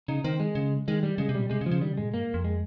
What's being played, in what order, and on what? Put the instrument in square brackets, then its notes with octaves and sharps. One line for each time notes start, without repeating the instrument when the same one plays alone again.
[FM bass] C#3 [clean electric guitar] D#4
[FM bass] D#3 [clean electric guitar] C4
[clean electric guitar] G#3
[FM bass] C#3
[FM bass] D#3 [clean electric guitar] G#3
[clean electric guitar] G3
[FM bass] C#3 [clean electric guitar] G#3
[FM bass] C3
[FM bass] A#2 [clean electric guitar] G3
[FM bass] C3 [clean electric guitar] G#3
[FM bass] C#3
[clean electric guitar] F3
[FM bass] C#3
[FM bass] D#3 [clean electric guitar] G3
[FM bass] C#3
[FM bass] G#2 [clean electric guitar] G#3
[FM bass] A#2
[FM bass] G2 [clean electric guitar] A#3
[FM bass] G#2
F2
[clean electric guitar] G#3